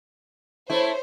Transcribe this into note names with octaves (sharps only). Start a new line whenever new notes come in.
A3 E4 C5 C#5